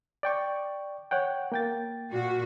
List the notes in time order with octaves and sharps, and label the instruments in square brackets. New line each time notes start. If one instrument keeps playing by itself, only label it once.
[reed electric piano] D5 G5 C#6
C#5 F#5 G5
A#3 G5 A6
[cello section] A#2 F#4